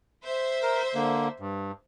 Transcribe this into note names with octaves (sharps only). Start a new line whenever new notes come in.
C5 E5
A#4
D3 A#3
G2